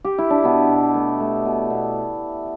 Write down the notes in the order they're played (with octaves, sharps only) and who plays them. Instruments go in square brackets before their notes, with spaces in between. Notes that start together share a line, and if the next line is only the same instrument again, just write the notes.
[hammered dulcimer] G4
E4
D4
B2 B3
B2
A3
A3
B2
B2